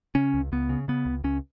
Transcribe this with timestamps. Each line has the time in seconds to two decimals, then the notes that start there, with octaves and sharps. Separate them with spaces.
0.15 C#3 C#4
0.34 C#2
0.52 C#2 B3
0.69 C#3
0.88 C#3 B3
1.06 C#2
1.24 C#2 C#4